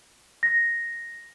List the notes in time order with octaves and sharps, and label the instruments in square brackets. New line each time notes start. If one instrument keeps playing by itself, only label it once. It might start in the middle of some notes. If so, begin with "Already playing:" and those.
[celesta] A#6